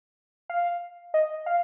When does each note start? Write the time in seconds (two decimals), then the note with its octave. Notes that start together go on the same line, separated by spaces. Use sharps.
0.50 F5
1.14 D#5
1.46 F5